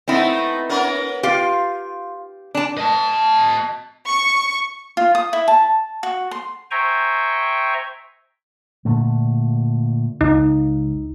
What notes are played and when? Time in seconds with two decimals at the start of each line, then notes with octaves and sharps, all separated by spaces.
0.08 A3 B3 C4 D#4 E4
0.69 B3 C#4 A#4
1.23 F4 G4 F5
2.55 D4 A5
2.78 D#5 A5
4.07 C#6
4.97 F4
5.15 D#6
5.33 E4
5.48 A5
6.03 F#4
6.31 C6
6.71 C5 E5 G5 G#5 A#5 C#6
8.85 A#2 D3 A3
10.21 C#2 D#4